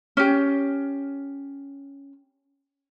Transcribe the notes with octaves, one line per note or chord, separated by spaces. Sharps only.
C#4 G4